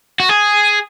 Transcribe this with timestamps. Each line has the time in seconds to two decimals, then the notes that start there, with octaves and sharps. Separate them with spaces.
0.20 F#4
0.29 G#4